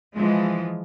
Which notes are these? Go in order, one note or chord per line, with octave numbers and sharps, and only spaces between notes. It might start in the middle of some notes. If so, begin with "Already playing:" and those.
E3 F3 G#3